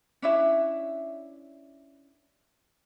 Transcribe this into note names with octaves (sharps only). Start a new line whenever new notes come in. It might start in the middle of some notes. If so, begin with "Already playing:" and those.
C#4 D4 E4 E5